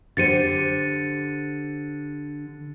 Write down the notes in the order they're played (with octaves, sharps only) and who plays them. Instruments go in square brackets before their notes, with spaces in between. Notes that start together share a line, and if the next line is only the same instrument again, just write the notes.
[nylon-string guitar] D3 G4 C5 [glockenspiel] A6 C#7 D#7